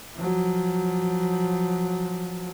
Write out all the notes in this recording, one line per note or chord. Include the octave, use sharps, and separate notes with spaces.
F3 F#3